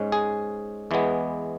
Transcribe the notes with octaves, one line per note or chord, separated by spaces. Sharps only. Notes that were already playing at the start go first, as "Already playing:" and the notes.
Already playing: G#2 G#3 C#4
G#4
E2 E3 G#3 B3